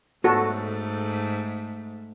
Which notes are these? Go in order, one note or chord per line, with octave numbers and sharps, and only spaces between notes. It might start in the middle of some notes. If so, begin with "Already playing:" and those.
G#2 A3 F#4 A4